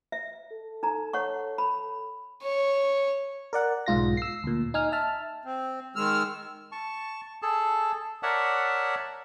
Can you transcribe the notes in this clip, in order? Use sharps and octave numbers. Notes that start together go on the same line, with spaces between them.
E5
A4
D#4 A#5
C#5 F#5 C#6
B5
C#5
A#4 D5 F#5
B1 G#2 F4 A#6
E6 C7
D2 A#2
D#4 G#5 F6
E5 A5 F6
C4
D#3 G#3 E6 F6
A5 C#6
G#4 A4 A5
A#4 C#5 D5 E5 F#5 A5